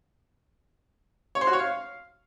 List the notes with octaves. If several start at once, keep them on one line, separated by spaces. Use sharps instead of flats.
C#5
C5
F#4
C#5
F5